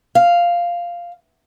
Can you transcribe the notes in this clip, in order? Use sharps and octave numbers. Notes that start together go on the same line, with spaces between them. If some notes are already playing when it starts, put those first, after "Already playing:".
F5